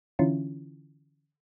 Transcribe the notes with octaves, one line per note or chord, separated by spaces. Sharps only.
D3 E3 C#4 E4 F4